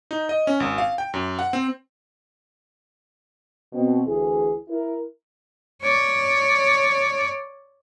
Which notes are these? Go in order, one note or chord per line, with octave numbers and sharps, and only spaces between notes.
D#4
D#5
C#4
G#1
F5
G5
F#2
F#5
C4
B2 C4
D2 E3 G#4
E4 A#4
C#5 D5